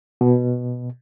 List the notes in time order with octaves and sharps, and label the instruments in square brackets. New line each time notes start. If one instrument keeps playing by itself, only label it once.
[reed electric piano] B2